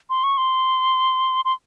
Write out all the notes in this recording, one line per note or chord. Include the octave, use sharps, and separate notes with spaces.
C6
C#6
C6
C6